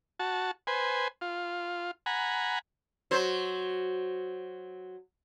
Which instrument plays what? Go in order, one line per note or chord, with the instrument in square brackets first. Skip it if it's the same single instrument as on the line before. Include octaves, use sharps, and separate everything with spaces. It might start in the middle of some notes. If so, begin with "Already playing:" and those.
[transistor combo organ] F#4 A5
B4 C5 G#5
F4
F#5 G#5 A#5 B5
[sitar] F#3 C5